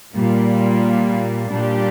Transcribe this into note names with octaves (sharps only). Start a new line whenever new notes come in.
A#2 G3 A#3
A#2 G3 D4 G4